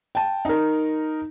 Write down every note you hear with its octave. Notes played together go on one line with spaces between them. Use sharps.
G5 A5
D#4 A#4